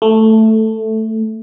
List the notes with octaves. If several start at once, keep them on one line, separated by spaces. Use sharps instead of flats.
A3